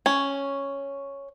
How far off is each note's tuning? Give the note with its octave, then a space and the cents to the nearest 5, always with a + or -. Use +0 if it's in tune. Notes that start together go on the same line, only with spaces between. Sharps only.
C#4 +0